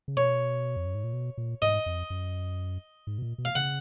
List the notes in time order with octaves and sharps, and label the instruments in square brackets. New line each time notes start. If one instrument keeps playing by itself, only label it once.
[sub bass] C#3
[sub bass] B2 [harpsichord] C#5
[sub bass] F2
F#2
G#2
A#2
B2
A#2
[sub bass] G#2 [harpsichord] D#5
[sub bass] F2
F#2
G#2
B2
A#2
B2
[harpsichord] F5
[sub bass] C#3 [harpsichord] F#5